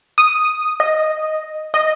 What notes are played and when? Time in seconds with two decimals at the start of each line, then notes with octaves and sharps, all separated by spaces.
0.18 D#6
0.80 D#5
1.74 D#5